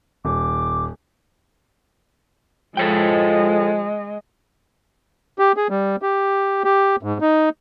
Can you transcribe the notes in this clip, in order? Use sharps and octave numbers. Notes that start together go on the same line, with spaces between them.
D#1 D6
F3 G#3 A4 C#5 D#5 G5
G4
G#4
G3
G4
G4
G#2
D#4